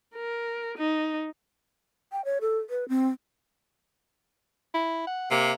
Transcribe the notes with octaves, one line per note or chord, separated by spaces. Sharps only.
A#4
D#4
G5
C#5
A4
B4
C4
E4
F#5
C3 A#3